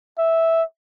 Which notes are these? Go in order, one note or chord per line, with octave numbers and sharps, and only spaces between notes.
E5